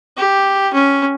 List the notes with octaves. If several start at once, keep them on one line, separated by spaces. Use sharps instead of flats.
G4
C#4